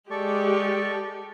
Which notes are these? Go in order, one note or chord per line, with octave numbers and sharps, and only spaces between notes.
G#3 G4 A4 D5 C#6